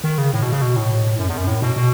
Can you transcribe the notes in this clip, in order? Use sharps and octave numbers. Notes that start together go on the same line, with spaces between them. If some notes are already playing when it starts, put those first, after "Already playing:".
D#3
C#3
A2
B2
C#3
B2
A2
F#2
E2
F#2
A2
B2
B2